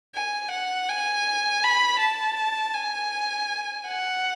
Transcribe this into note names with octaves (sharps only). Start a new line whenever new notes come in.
G#5
F#5
G#5
B5
A5
G#5
F#5